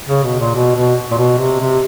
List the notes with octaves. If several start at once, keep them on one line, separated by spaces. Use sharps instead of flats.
C#3
B2
A#2
B2
B2
A#2
B2
C3
C3